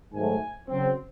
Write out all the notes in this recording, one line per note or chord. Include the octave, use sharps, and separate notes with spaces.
G#2 D#3 F#3 A3 G#5
C#3 F#3 C4